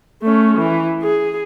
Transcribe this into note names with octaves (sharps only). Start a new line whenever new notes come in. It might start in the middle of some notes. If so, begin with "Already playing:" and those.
A3 C#4
E3
G#4